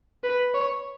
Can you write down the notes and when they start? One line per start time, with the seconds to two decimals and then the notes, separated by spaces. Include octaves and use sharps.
0.24 B4
0.54 C#5